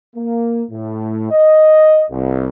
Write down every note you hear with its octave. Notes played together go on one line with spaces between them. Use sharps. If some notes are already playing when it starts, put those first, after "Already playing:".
A#3
A2
D#5
C2